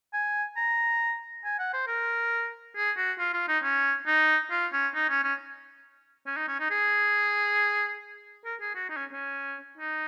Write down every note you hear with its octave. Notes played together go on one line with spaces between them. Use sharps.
G#5
A#5
G#5
F#5
C5
A#4
G#4
F#4
F4
F4
D#4
C#4
D#4
F4
C#4
D#4
C#4
C#4
C#4
D#4
C#4
D#4
G#4
A#4
G#4
F#4
D#4
C#4
C#4
D#4